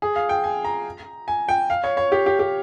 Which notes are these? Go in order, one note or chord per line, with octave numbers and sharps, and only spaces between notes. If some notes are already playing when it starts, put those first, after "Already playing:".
G#4
F5
G5
G#5
A#5
G#5
G5
F5
C#5
C#5
G4
G4
G4